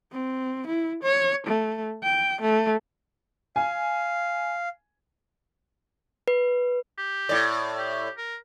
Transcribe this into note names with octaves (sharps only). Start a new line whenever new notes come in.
C4
E4
C#5
A3
G5
A3
F5 G#5
B4
G4
A2 D5
G4
A#4